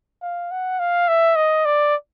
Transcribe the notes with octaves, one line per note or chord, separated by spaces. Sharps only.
F5
F#5
F5
E5
D#5
D5